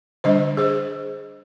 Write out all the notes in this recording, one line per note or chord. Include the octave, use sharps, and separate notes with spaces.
D3 G3 D4 C5 D#5
G#4 C5